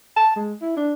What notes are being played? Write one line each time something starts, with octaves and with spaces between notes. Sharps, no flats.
A5
G#3
E4
D4